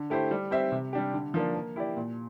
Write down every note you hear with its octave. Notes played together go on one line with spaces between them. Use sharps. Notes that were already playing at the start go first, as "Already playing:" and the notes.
Already playing: D3
A3 E4 G4 C5
G3
C4 G4 C5 E5
C3
G3 D4 G4
D3
F3 A#3 D4
A#3
E4 G4 D5
A#2